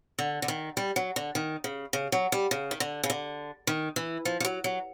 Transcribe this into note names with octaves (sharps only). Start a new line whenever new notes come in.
D3
D3
D#3
G3
F#3
D3
D#3
C#3
C#3
F#3
G3
C#3
D#3
D3
C#3
D3
D#3
E3
F3
F3
F#3
F#3